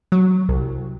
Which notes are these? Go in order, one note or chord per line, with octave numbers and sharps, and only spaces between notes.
F#3
C2